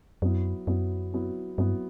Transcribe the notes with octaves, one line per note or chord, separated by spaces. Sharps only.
F#2 F#3 B3 E4
F#2 F#3 B3 E4
F#3 B3 E4
G2 F#3 B3 E4